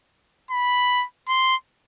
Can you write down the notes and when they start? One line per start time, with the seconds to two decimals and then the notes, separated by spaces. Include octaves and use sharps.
0.51 B5
1.28 C6